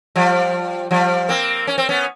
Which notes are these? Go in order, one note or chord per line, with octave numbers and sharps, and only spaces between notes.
F3 G3
F3 G3
A#3 C4
C#4
C4
B3 C#4